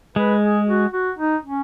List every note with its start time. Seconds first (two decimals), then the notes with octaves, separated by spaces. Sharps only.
0.16 G#3 B4
0.42 G#4
0.68 F#4
0.93 F#4
1.19 D#4
1.44 C#4